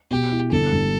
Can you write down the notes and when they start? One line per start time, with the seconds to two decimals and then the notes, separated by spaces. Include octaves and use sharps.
0.11 B2 G4
0.32 E4
0.51 G1 A4
0.72 G2